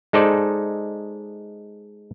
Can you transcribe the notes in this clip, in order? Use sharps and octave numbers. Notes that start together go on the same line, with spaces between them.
G#3 D#4 A4 C5 D5